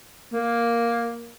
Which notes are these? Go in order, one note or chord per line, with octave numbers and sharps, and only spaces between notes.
A#3